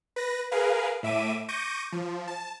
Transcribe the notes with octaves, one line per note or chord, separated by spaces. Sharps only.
B4 A#6
G#4 A#4 B4 F5
A2 E5 D6 D#7
C#6 D6 G6 A#6 D#7
F3
A5